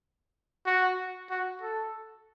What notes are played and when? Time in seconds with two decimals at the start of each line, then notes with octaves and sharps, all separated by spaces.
0.66 F#4
1.30 F#4
1.62 A4